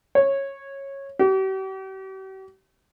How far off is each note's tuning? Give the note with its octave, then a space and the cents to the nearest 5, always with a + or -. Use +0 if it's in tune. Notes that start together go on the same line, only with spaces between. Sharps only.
C#5 -15
G4 -45